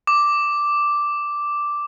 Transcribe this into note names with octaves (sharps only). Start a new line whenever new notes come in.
D6